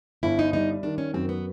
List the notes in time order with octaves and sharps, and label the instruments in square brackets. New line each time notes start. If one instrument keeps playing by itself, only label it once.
[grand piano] G1 [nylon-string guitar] E4
[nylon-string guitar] D#4
[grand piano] G3 [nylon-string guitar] D#4
[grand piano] D#3 [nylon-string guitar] D4
[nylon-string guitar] C#4
[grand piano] F#2 [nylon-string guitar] C4
[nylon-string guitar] B3